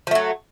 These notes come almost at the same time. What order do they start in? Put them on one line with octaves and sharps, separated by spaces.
F3 A3 F#3